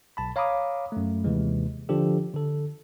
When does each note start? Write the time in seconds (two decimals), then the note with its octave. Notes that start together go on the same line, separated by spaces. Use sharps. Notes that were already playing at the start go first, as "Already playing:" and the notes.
0.17 B1 A5 B5
0.36 C#5 F5 A#5 B5 D6 D#6
0.92 F#2 A3
1.24 D#2 C3 E3 G#3
1.89 D3 F3 D4 G4 A4
2.34 D3 A4